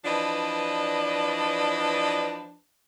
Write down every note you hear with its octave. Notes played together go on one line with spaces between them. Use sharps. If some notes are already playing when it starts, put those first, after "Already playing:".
E3 F3 D4 B4 D5 D#5